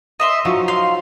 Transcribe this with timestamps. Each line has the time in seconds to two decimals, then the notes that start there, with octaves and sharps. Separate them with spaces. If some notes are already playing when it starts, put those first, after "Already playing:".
0.20 D#5 E5 C6
0.45 F3 F#3 D#4 C#5
0.68 F5 C6